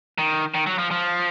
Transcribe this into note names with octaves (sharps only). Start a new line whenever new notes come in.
D#3
D#3
F#3
F3
F3